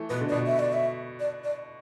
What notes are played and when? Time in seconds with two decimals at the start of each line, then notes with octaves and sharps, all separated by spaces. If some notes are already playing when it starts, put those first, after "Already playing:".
Already playing: E3 A3
0.09 B2 B4
0.21 D3
0.29 D5
0.32 B2
0.46 E5
0.59 D5
0.73 E5
1.20 D5
1.44 D5